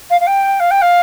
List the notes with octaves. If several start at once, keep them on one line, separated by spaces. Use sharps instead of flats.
F5
F5
G5
F5
G5
F5